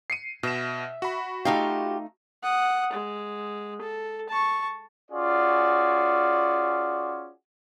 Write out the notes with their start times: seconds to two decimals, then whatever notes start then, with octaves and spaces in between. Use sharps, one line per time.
0.10 C7 C#7 D#7
0.43 B2 E5 E7
1.02 F#4 B5
1.45 A3 D#4 F4 G4 F5
2.43 F#5 D#6
2.93 G#3
3.81 A4
4.29 A5 C#6
5.11 C#4 F4 F#4 G#4 D5